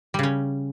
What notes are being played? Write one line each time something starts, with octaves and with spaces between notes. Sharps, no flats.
C#3 G3 C#4